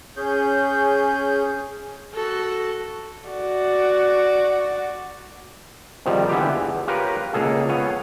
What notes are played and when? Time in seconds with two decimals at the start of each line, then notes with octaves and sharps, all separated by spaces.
0.17 C#4 G#4 G6
2.14 F#4 A4
3.29 F#4 D5
6.06 G#2 C3 D#3 F3 G3
6.29 D3 E3 B3 F4 G4
6.55 E2
6.88 F4 G4 A#4 B4 C#5
7.33 C#2 A#3 G#4 A4 F5
7.69 B3 C#5 F5 G#5